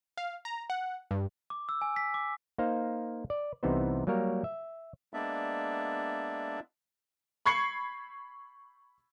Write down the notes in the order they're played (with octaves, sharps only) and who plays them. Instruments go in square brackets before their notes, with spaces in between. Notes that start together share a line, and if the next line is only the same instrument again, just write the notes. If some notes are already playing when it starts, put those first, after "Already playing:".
[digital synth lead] F5
A#5
F#5
G2
[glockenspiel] D6
E6
G#5
B6
D6
[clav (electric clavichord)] A#3 D#4 C5 F5 A#5
D5
C2 C3 E3 B3 D#4 C5
F#3 G3 A#3 A#4 C#5
E5
[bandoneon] G#3 A#3 B3 D4 D5 E5
[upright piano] B5 C#6 G#6 C7 C#7 F#7